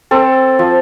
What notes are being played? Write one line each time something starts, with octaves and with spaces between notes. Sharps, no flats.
C4 A4
F3